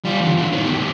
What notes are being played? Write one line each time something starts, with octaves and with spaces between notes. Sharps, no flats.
G3 F4
E2 D3
A2 F#3
D#3 B3
F2 G3
A#2 D#3